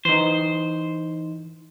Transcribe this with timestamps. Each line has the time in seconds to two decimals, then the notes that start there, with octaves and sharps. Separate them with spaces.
0.05 E3 D#4 C5